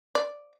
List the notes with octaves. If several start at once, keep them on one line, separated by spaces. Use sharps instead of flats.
D5